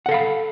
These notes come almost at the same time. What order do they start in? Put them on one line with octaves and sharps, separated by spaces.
F#5 A4 F5 B5